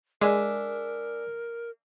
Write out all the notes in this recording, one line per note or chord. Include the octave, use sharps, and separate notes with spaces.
G#3 D4 A#4 E5 G#5